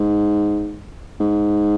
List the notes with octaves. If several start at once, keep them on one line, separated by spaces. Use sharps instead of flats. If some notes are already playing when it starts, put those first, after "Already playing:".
Already playing: G#2
G#2